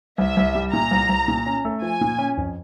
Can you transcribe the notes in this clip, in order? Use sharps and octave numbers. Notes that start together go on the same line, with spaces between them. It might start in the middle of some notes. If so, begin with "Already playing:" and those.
C2 E5
C2
G3
A#2 A#5
C2
C2
A#2
C#4
A3
F3 G#5
A#2
C#4
F2